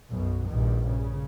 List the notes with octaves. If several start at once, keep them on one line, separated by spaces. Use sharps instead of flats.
B1 F#2 B2
A#1 G2 D#3
C#3